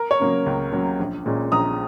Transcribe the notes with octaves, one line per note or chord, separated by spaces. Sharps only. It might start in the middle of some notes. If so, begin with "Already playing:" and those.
Already playing: A#4
C#5
C#3 F#3 A#3 C#4
C#2
C#3 F#3 A#3 C#4
A#1
A#2 G#3 C#4
A#1 A#5 D#6